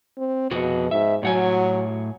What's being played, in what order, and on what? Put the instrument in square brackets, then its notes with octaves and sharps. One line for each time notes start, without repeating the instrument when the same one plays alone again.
[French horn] C4
[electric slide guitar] F2 F#4 G#4 [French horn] B2
[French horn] G#2 [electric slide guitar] E5
[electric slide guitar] A2 F#5 G#5 [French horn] F#3